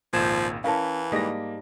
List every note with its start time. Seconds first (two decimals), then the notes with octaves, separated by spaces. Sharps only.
0.13 G#1 C#2 A#2 F3 G6 G#6 E7
0.64 E3 C#4 E4 A#4 C#5 F5 A5
1.12 G#2 G3 A#3 D#5 A#6